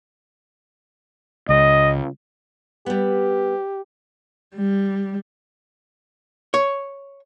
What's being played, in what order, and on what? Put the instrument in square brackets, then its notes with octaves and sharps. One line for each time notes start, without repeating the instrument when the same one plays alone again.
[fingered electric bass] C#2 [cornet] D#5
[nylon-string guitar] G3 B3 [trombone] G4
[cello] G3
[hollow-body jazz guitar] C#5